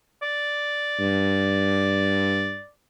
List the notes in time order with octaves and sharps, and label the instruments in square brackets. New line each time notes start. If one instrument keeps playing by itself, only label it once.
[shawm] D5
[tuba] G2